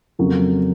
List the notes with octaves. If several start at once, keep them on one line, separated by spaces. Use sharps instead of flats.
F2 C#3 F#3 A#3 C#4